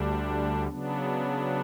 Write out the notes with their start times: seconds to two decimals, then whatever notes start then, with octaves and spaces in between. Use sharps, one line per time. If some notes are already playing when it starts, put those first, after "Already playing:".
Already playing: D2 D3 G3 D4
0.67 C#3 F#3 B3 D4